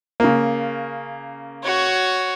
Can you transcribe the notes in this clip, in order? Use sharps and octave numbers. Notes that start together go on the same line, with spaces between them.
C#3 A#3
F#4 C#5